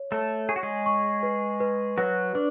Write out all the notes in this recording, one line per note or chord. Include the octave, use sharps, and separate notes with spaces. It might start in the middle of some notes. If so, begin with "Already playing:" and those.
Already playing: C#5
A3 A4 C#5
G#4 C#6
F#4
G#3 G#4
C#6
B4
B4
F#3 F#4 B4
D4 B4